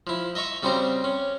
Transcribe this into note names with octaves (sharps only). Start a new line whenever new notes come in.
F3 E4
D#5 E5 A#5 C#6 D#6
C#3 G3 C4 F#4 C5 A#5
C#4